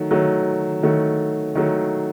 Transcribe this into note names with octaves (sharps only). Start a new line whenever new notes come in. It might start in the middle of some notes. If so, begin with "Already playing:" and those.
Already playing: D#3 F#3 A3
D#3 F#3 A3
D#3 F#3 A3
D#3 F#3 A3